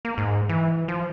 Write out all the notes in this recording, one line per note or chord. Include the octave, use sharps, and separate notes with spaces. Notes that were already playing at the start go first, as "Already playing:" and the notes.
A#3
G#2
E3
F3